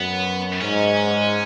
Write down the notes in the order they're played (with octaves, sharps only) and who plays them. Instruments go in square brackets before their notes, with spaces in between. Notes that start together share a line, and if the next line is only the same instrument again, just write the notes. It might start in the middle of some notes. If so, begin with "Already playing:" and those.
Already playing: [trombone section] F#2 [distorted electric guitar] B3
[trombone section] G#2 [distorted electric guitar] C#4